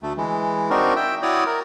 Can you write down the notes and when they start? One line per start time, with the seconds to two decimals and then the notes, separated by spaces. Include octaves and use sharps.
0.03 D2 A3
0.18 E3 G#3
0.70 C4 D4 D#4 F#4 A#4
0.96 E5 G5
1.23 E4 F#4 C#5 D5 D#6
1.46 A#4